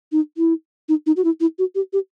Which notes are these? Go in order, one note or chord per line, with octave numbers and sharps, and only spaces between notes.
D#4
E4
D#4
D#4
F#4
E4
E4
F#4
G4
G4